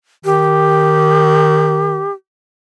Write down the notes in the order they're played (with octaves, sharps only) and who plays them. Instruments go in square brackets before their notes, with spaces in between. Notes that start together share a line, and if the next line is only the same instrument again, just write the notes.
[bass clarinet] D#3 [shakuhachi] G4